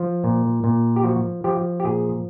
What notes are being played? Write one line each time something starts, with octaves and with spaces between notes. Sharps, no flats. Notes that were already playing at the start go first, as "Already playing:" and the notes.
Already playing: F3
A#2
A#2
G4
F3 F#4
F3 G4
G4
A#2 G#4